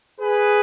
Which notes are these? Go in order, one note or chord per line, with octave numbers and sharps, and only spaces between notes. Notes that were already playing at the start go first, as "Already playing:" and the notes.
G#4 B4